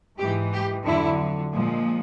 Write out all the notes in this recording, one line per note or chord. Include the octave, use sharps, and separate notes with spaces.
G#2 E3 G#3 G4
G4
F2 D3 F#3 E4
A#2 F3 G#3